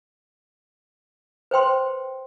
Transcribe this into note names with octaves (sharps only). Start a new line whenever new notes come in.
B4 C5 G5 C6